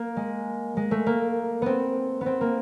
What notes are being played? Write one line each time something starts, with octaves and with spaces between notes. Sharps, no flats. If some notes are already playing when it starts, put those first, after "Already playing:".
Already playing: A#3
G#3
G#3
A3
A#3
B3 C4
B3
C4
A#3